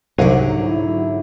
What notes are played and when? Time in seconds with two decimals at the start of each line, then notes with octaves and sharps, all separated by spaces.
0.18 C2 G#2 D3 F#3 F5 G#5
0.63 E4